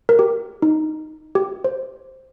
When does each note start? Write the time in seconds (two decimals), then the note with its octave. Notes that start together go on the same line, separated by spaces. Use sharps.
0.09 A#4
0.19 G4
0.62 D#4
1.35 G4
1.64 C5